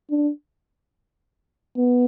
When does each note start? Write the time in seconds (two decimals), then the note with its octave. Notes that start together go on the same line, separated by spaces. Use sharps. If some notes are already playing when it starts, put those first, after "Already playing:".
0.10 D4
1.77 B3